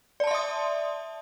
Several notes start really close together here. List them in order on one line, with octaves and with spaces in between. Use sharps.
D5 A5 C6 E5 D#6